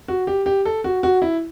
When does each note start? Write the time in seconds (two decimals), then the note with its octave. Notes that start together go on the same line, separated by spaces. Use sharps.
0.08 F#4
0.27 G4
0.46 G4
0.65 A4
0.84 F#4
1.03 F#4
1.22 E4